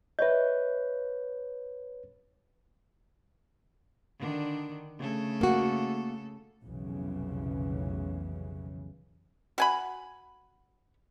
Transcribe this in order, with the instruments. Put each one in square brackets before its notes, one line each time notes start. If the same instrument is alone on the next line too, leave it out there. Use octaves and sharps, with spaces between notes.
[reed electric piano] B4 C#5 G6 [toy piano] D#5 E5
[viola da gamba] D3 D#3 D4
C#3 A3 A4
[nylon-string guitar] A#3 F#4
[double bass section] F1 B1 C#3 E3
[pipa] F#4 G#5 B5